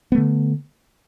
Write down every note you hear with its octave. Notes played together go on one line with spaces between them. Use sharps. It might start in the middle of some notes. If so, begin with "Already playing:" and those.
D3 A3 B3